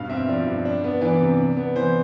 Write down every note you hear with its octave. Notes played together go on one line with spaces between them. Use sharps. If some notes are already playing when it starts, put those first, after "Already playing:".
Already playing: G2 B2 F5
C4 E5
F3 D5
G2
D4
B3
E3 D5
C3
D4
B3
E3 C5